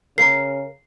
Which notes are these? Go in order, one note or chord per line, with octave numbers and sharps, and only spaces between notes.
C#3 A#4 F5 A#5 C7